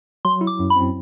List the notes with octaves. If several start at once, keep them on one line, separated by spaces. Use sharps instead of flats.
F#3 C6
E4
D6
F#2
B5
C4